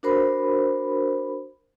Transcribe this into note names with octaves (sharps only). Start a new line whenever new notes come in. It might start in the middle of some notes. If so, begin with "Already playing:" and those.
D4 F#4 A#4 C5 B5